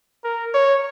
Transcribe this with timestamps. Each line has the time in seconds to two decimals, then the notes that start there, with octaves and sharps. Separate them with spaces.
0.24 A#4
0.54 C#5